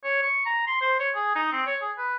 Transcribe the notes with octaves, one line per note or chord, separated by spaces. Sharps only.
C#5
C#6
A#5
C6
C5
C#5
G#4
D#4
C4
C#5
G#4
B4